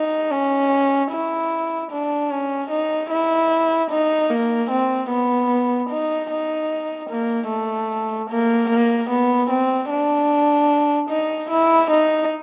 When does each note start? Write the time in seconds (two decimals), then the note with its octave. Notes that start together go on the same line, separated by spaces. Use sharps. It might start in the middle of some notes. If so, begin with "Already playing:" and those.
Already playing: D#4
0.31 C#4
1.12 E4
1.91 D4
2.31 C#4
2.71 D#4
3.10 E4
3.91 D#4
4.30 A#3
4.71 C4
5.10 B3
5.90 D#4
6.31 D#4
7.10 A#3
7.50 A3
8.30 A#3
8.70 A#3
9.10 B3
9.50 C4
9.91 D4
11.10 D#4
11.50 E4
11.91 D#4